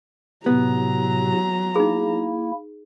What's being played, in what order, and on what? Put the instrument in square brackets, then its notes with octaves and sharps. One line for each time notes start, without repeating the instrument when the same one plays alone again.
[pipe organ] A2 C3 [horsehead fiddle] F#3 A#5 [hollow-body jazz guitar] B3
[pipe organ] A#3 E4 [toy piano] D#4 G#4